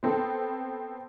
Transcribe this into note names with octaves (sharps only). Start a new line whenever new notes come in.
B3 C4 A4